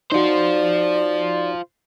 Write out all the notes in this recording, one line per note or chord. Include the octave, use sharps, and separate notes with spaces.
D#4 F4 F#4 C5 D5